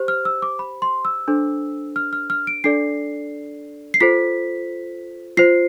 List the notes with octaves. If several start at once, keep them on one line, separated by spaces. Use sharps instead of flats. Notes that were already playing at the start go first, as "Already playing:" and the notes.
Already playing: G4 C5
F6
E6
D6
B5
C6
E6
D4 A4 C5
F6
F6
F6
D7
D4 A4 D5 C7
C7
F4 A4 C5 B6
F4 C5 C7